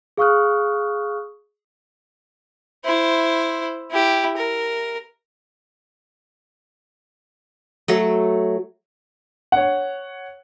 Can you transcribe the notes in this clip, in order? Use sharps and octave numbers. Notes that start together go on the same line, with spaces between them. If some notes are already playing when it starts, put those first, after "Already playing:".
G#4 F5 C#6 D#6 F6 F#6
E4 C5
E4 G4
A#4
F#3 A3 A4
C#5 F#5